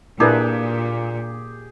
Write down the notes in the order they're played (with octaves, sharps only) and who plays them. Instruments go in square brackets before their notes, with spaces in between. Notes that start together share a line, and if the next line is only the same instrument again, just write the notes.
[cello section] A#2 [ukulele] D4 [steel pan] E4 A#4 B4 [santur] G4 G#4